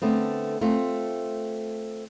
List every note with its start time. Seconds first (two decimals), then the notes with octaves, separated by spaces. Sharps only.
0.02 D3 A3 B3 C4
0.61 A3 C4 F4